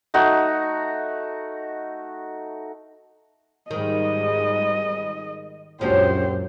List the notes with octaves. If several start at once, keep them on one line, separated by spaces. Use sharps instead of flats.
A3 D#4 F#4
G#2 D#3 G3 G#3 D#5
C#2 F#2 A#2 F3 C#4 D4 G4 C5